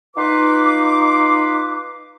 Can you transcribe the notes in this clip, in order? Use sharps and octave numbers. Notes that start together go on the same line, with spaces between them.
D#4 F4 B4 C6 D6